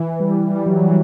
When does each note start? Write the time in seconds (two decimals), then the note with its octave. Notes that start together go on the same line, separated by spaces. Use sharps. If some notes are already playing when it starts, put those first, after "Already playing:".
Already playing: E3
0.20 G3
0.50 G3
0.66 F#3
0.82 E3